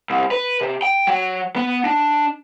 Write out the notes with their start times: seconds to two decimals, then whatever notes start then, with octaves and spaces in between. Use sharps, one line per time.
0.10 C2
0.31 B4
0.61 C3
0.82 G5
1.07 F#3
1.56 B3
1.85 D4